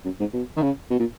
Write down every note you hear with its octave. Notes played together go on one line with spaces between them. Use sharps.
F#2
G#2
B2
D#3
C#3
B2
A#2